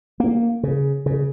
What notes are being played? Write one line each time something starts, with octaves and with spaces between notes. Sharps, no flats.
A#3
C#3
C#3